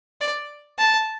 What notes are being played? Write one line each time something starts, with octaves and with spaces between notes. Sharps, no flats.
D5
A5